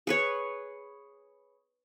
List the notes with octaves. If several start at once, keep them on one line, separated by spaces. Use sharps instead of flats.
G#4 B4 C#5